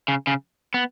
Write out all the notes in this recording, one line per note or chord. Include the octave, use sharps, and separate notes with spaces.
C#3
C#3
B3